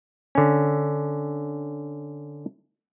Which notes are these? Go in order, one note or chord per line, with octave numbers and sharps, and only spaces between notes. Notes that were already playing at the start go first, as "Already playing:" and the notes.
D3 C#4